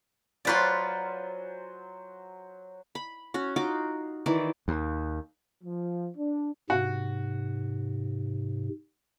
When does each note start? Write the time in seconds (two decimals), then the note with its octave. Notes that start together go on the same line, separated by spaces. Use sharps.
0.45 F#3 F4 B4 C5 D5 G#5
2.95 B5
3.34 C#4 F#4
3.56 D#4 F4 F#4 D6
4.26 D#3 E3 E4 D5
4.68 D#2
5.64 F3
6.17 D4
6.70 G#2 C3 F#4